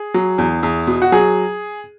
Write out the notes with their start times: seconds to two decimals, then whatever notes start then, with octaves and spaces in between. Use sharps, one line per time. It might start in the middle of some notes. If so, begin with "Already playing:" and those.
Already playing: G#4
0.14 F#3
0.38 E2
0.63 E2
0.87 B2
1.02 F#4
1.12 F#3 G#4